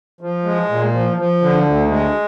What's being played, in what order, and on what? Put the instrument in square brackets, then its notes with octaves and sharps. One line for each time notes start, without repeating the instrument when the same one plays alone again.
[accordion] F3
G#3
A#2
F3
F3
D3
D2
G#3